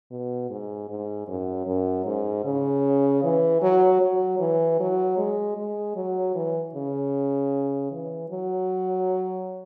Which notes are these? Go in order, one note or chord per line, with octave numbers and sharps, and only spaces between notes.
B2
G#2
G#2
F#2
F#2
G#2
C#3
E3
F#3
F#3
E3
F#3
G#3
G#3
F#3
E3
C#3
E3
F#3